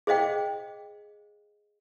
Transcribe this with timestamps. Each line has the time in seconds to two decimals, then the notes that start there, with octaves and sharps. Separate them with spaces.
0.07 G#4 C5 D#5 F5 G5